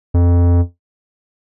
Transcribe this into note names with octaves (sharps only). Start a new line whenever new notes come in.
F2